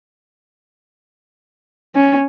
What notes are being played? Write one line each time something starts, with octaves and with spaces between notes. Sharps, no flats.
C#4